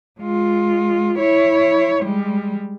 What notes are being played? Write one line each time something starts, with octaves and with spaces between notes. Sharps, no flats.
G#3 F4
E4 C#5
G3 G#3